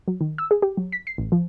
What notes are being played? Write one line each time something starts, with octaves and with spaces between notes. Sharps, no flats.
F#3
D#3
E6
G#4
G4
F#3
B6
C7
A1
F3